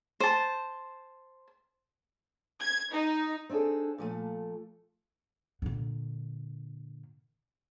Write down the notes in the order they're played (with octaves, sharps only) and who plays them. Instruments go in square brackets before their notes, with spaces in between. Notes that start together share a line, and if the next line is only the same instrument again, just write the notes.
[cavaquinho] C5 A5
[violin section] G#6
D#4
[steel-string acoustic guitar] C4 D4 D#4 G#4 A4
A#2 F3 A3
[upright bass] A#2 D3